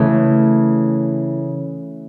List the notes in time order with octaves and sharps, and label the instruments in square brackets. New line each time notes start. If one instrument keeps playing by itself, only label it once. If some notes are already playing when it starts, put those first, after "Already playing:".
Already playing: [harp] C#3 E3 A3